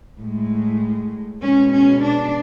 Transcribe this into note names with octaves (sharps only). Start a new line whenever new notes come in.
A2 G#3
B2 G#3 C#4
C#4
D4